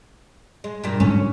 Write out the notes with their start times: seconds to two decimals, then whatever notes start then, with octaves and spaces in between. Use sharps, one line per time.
0.64 G#3
0.84 G2 A#2
1.00 G#2 D3 F#3 C#4